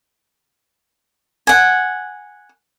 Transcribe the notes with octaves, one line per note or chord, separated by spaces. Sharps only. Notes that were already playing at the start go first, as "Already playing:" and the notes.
F#5 G#5